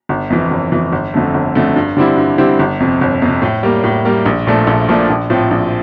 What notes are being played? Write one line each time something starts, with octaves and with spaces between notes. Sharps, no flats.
G1
F2 E3
G1
F2 E3
G1
F2 D3 A3
G1
F2 D3 A3
G2
D3 G3 C4 E4
G2
D3 G3 C4 E4
G1
F2 C3
G1
F2 C3
A2
G3 A#3
A2
G3 A#3
A#1
A#2 F3 A3 D4
A#1
A#2 F3 A3 D4
A#1
A2 F3 C4
A#1